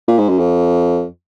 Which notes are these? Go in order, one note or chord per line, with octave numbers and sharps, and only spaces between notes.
A#2
G#2
F#2
F2